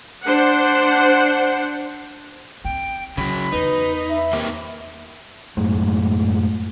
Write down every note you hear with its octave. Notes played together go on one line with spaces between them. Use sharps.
D4 C5 F#5
C4 G5
C#3 F#3 F4 B5
E2 D#4 B4
E5
A#3 C4 G4
F#2 A2 G#3 A3